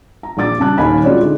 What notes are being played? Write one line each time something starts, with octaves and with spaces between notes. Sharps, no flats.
A#5
A#1 D5 D6 A6
G2 C#3 A5 F#6
D#1 D#2 B2 F5 G#5 B5
G#3 C#4 F4 F#4 C#5 D5
D3 D#3 G#3